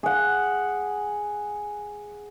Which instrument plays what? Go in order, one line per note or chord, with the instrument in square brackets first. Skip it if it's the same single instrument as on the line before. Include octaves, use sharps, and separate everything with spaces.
[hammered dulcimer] G#4 F#5